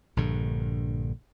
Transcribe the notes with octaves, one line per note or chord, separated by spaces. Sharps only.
A#1 G2 D3